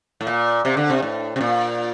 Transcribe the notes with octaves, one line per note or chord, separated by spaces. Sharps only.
A2
A#2
C3
D3
C3
A2
C3
A#2